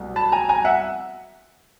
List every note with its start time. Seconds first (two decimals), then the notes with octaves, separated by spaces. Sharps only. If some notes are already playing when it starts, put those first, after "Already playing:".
Already playing: C2 B2 F#3 A3
0.16 A5 B5
0.32 G#5 A#5
0.49 G#5 A#5
0.65 E5 F#5